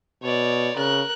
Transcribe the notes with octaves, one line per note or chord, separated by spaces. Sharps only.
B2 C#5 D5
C#3 A#4 F#6